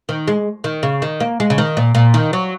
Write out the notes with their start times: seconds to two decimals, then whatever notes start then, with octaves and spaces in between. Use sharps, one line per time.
0.09 D#3
0.28 G#3
0.64 D#3
0.83 C#3
1.02 D#3
1.20 A#3
1.40 G#3
1.50 C#3
1.58 D#3
1.77 A#2
1.95 A#2
2.14 D#3
2.33 F#3